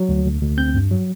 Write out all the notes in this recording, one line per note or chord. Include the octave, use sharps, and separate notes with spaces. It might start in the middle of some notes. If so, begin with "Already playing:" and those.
Already playing: F#3
D2
D2
D2
C4 G6
G2
F#3